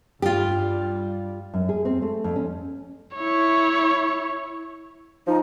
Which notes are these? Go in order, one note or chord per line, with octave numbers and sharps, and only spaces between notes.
G2 G3 F4 G4
F#2
G#4
C4
A3
F2
C#4
E4 C#5
F3 D#4